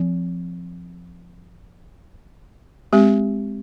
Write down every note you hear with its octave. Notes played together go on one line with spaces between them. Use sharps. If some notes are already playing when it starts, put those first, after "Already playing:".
Already playing: F3 C4
G#3 C4 G4